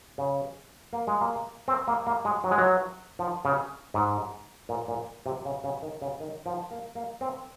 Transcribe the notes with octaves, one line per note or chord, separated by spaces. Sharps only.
C#3
A#3
G#3
A#3
C4
A#3
A#3
G#3
F#3
G#3
F#3
F3
C#3
G#2
A#2
A#2
C3
C#3
C#3
D#3
C#3
D#3
F3
A#3
A#3
C4